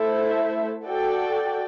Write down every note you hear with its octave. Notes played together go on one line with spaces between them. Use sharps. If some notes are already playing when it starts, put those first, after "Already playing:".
Already playing: A3 E4 A4 C5 E5
F#4 A4 D5 G5